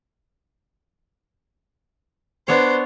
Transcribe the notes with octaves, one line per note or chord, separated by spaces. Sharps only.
B3 D4 C5 C#5